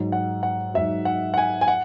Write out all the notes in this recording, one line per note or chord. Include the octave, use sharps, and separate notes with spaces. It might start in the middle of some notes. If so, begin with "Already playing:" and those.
Already playing: G#2 F#3
F#5
F#5
G#2 F#3 E5
F#5
F#5
G#5
G#5
F#5